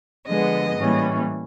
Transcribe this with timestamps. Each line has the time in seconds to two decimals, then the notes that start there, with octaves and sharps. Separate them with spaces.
0.27 D3 F3 G#3 B3 D#5
0.77 A2 E3 G3 A#3 C#4